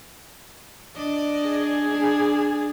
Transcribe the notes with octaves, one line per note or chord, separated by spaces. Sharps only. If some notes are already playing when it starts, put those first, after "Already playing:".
D4 D5 D#5
G#4
D4